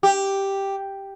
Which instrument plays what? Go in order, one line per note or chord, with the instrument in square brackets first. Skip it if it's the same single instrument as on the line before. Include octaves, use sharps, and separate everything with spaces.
[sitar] G4